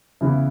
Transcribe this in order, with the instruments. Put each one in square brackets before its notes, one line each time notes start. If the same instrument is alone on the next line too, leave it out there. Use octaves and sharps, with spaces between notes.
[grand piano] C#3 E3 B3 E4